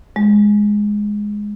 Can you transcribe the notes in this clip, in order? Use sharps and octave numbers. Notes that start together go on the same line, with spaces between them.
G#3